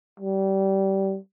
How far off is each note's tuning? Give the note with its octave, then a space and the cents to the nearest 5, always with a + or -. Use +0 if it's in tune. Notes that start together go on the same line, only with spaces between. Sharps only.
G3 -20